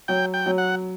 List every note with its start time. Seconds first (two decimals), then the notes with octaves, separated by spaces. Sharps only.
0.08 F#3 G5
0.34 G5
0.46 F#3
0.58 F#5